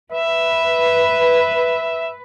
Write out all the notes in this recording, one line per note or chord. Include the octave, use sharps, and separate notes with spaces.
B4 E5